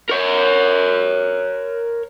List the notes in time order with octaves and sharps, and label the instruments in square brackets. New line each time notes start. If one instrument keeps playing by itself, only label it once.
[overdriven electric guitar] A#4 C#5